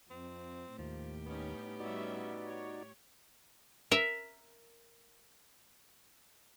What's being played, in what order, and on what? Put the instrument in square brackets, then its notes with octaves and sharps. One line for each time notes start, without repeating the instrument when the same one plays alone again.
[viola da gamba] F2 [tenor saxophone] C4
[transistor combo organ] D#2 [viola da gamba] A2 G4 [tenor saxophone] F3
[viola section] G3 C#4 D#4 [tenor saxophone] B3
[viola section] G3 C#4 E5 [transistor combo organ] D#4 F#4 D5
[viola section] C#5
[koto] A#4 E5